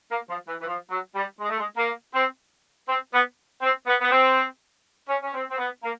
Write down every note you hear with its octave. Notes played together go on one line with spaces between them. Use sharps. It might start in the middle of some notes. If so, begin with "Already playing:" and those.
A#3
F3
E3
E3
F3
F#3
G3
G#3
A3
G#3
A#3
C4
C4
B3
C4
B3
B3
C4
C#4
C#4
C4
C4
B3
A#3